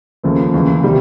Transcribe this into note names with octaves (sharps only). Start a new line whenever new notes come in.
D#2 C#3 F3 A3
D#2 C#3 E3
C3 D#3 G3